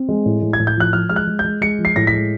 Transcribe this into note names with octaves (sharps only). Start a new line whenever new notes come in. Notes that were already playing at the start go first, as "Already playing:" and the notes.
Already playing: C4
G#3
A2
A2
G#6
A2
G6
F3 F#6
F3 F6
G#3 F6
F#6
G#3
G6
G#3
G#3 C#7
F3
C7
A2 A#6
B6
G#3